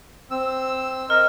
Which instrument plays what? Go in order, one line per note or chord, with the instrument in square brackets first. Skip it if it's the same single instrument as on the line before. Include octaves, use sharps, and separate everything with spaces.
[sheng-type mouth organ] C4 E6
[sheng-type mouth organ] A#4 D#5 [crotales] F6